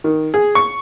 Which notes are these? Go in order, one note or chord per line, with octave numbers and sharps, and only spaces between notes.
D#3
G#4
C#6